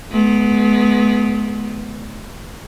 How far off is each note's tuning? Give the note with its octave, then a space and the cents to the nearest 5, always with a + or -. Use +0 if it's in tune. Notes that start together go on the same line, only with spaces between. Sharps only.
G#3 +40 B3 +0